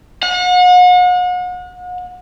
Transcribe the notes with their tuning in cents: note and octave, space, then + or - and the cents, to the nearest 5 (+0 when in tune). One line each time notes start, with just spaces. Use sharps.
F#5 -40